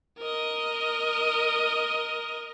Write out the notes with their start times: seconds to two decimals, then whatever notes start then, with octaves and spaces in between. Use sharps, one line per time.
0.18 A#4 D#5